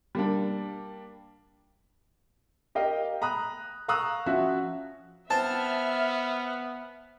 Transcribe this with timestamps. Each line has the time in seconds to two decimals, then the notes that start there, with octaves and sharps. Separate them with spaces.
0.15 G3 A#3 D4
2.75 G4 A#4 D#5 F5 G5
3.22 A#5 B5 D#6 F#6
3.88 F5 A#5 C#6 D#6 E6 F#6
4.26 F3 C#4 F#4 E5
5.30 B3 C4 E5 A5 F6